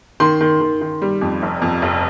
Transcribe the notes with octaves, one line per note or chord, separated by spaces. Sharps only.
D#3 C6
D#3
D#3
D#3
G3
F2
F1
F2
F1